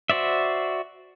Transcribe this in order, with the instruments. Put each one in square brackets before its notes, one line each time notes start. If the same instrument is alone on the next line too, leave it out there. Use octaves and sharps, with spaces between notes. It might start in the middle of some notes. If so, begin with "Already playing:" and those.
[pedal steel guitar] F#4 C5 D5 E5